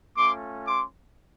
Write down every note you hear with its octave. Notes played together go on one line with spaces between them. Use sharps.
A3 C#4 F4 C6 D6
C6 D6